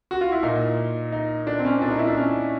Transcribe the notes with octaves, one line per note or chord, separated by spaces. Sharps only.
F#4
F4
E4
A#2 D#4
D#4
D4
C4
C#4
A#2 D4
D#4
E4
D4
C#4